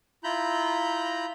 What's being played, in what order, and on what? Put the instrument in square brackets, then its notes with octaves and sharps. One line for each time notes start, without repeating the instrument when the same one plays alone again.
[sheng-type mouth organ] E4 F4 A#5 B5 G6